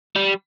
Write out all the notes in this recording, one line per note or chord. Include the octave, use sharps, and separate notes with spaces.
G3